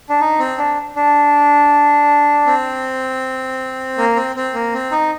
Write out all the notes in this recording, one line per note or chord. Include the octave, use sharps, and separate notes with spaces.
D4
D#4
C4
D4
D4
C4
A#3
C4
C4
A#3
C4
D#4